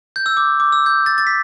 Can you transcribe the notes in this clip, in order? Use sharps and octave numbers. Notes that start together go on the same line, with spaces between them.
G6
E6
D6
D6
E6
G6
A6
A6
B6